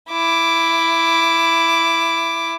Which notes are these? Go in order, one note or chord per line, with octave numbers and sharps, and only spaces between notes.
E4 D6